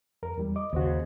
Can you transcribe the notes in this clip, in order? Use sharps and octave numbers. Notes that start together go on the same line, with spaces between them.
F2 A#4
E2 G3
D#5 D6
D#2 C#3 F#4 C5 D#5